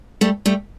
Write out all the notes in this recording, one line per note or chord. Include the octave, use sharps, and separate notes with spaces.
G3 A3
G3 A3